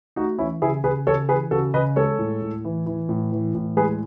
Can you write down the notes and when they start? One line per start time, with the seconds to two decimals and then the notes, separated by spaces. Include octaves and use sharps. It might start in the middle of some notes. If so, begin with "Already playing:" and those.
0.16 A3 D#4 F#4
0.39 E3 C#4 E4
0.62 C#3 E4 G#4
0.84 C#3 G#4 B4
1.07 C#3 A4 C#5
1.29 E3 G#4 B4
1.51 C#3 F#4 A4
1.74 C#3 B4 D#5
1.96 G#3 A4 C#5
2.19 A2
2.42 A2
2.65 E3
2.86 E3
3.09 A2
3.32 E3
3.55 A2
3.77 G#3 G#4 B4